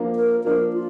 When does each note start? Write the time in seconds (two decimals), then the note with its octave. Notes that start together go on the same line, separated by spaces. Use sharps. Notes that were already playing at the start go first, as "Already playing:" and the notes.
Already playing: F3 A#3 D4
0.16 A#4
0.44 F3 A#3 D4 A#4
0.73 F4